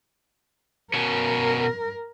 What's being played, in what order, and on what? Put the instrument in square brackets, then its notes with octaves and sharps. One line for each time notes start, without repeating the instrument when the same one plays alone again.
[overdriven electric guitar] B2 C#4 [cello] A#4